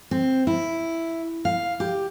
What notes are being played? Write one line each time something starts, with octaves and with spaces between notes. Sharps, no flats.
C4
E4
F5
G4